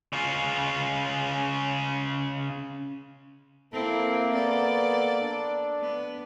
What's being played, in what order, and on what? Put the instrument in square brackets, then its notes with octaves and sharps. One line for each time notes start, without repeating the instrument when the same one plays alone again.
[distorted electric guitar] C#3 F4
[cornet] A#3 [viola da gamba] C4 E4 [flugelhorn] A4
[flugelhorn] B3 [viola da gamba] A4 D5
[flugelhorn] D4
[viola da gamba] B3